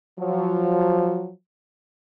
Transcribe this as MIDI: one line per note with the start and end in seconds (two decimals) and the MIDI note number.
0.20 1.32 53
0.20 1.32 54